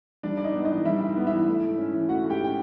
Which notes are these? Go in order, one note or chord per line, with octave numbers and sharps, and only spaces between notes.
G3 D4 D5
G#2 D5
D#4 D#5
B3
E3 D#4 D#5
G3 E4 E5
G#2
B3
E4 E5
E3
A3
G#2
C#4
E3
A3 F#4 F#5
G#2
G4 G5
C#4 G5